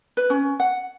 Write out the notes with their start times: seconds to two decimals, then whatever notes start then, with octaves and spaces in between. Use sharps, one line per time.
0.17 B4
0.30 C#4
0.60 F#5